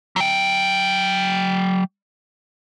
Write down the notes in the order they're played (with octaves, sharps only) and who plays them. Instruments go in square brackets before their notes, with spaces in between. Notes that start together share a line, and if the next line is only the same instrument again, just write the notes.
[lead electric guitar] F#3 G5